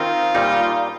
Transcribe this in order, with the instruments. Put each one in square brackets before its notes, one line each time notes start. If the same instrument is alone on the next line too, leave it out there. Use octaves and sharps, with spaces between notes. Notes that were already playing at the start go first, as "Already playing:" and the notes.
Already playing: [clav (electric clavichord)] D#3 C4 D#4 A#4 [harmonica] F4
[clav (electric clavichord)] A#2 G3 D#4